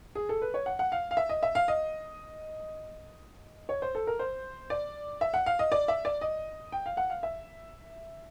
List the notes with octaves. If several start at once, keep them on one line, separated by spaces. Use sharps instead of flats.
G#4
A4
B4
C#5
F#5
F#5
F5
F5
E5
D#5
E5
F5
D#5
C#5
C5
A4
A#4
C5
D5
E5
F#5
F5
D#5
D5
E5
D5
D#5
G5
F5
F#5
F5
E5